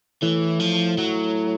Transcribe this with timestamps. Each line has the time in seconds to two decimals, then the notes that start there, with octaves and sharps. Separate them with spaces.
0.22 A2 E3
0.60 F3
0.98 F#3